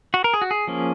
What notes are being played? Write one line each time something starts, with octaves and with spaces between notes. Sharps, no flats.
F#4
A#4
G#4
F#4
G#4
F3 A#3 C#4